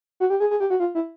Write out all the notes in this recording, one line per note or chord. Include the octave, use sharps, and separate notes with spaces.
F#4
G4
G#4
G#4
G4
F#4
F4
E4